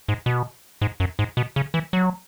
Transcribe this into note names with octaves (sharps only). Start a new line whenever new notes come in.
G#2
B2
G#2
F#2
G#2
B2
C#3
E3
F#3